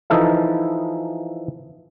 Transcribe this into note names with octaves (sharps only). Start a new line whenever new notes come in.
E3 F3 D#4 E4 A4 E5